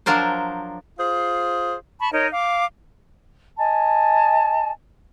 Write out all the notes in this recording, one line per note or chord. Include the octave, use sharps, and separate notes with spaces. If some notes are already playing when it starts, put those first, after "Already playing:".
F3 F#3 D4 A#4 C5
F4 G#4 C5
A5 B5 C#6
D#4 A#4 C#5 D#5
F5 D6
D#5 G#5 A5